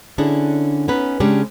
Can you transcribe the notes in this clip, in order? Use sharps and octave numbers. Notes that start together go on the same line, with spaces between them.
D3 C#4 D4 E4 G#4
B3 C#4 D#4 B4
C#3 G#3 C#4 D4 G4